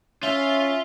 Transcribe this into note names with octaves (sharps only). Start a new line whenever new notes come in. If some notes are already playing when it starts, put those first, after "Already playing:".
C#4 F4 E5 F5